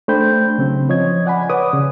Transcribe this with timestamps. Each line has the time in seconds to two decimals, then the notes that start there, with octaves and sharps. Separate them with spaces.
0.08 A3 D4 C5 G5 B5 G6
0.58 C#3 F#3 C4
0.89 F3 C#5 D#5 G#6
1.26 D5 F#5 G#5 B5
1.50 B4 C#5 D5 F#5 D6 D#6
1.73 C#3